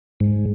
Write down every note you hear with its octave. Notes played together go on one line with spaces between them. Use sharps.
G#2